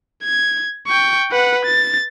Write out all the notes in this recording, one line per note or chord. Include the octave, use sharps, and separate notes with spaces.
G#6
G5 C#6
B4 F#5
A6